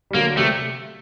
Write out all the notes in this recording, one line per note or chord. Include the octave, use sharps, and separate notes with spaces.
G3
D3 F#3 A#3
C3 A3